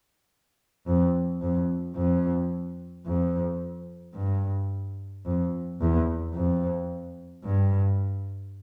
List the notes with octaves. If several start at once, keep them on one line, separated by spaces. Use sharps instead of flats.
F2
F2
F2
F2
G2
F2
E2
F2
G2